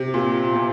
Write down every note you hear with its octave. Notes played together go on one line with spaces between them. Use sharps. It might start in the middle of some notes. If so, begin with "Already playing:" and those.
Already playing: C3
A#2
C3